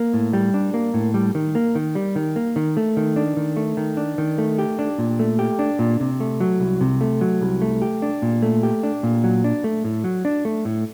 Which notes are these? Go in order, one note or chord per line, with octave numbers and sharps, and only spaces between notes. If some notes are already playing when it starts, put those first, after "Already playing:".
Already playing: A#3
A2
G3
D4
A#3
A2
G3
D#3
A#3
D#3
G3
D#3
A#3
D#3
A3
D#3
D4
D#3
A3
D#3
D4
D#3
A3
G4
D4
A#2
A3
G4
D4
A#2
C3
A3
F#3
C2
C3
A3
F#3
C2
A3
G4
D4
A#2
A3
G4
D4
A#2
F#3
D4
A3
A2
F#3
D4
A3
A2